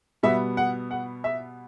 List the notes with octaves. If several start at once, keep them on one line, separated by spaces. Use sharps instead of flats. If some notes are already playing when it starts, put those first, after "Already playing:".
B2 G3 B3 E5
F#5
F#5
E5